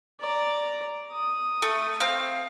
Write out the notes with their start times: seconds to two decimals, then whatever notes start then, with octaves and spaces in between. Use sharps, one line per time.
0.20 D5 A#5
1.12 D#6
1.62 A3
2.00 C4 F5